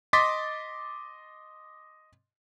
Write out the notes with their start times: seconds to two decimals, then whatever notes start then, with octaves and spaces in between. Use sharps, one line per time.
0.13 D#5 C6 D6 A6 B6